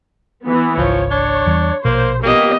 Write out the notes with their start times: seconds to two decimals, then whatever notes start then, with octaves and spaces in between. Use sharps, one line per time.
0.46 E3 B3
0.77 G#1 C#2 F3 C#5
1.11 D4 C#5
1.46 E2 E3 G3
1.85 A#1 B2 A#3 C5
2.23 A#3 B3 G4 D#5